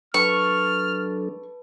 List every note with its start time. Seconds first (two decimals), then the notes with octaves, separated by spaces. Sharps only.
0.14 F#3 D4 A4 B4 A5 C#6 F6